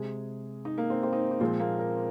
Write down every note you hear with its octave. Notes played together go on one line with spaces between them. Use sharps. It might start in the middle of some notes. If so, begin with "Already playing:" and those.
Already playing: C3 G#3 G#4
D#4
A#3
C4
C4
D#4
D#4
A#2 F3 G#3 C4
A#3
A#4